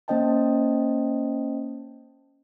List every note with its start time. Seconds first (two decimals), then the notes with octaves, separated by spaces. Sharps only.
0.08 A#3 C#4 C5 D#5 G5 A5